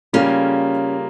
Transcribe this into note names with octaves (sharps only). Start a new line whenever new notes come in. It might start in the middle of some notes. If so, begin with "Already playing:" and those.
C#3 G3 A#3 C#4 F4 A#4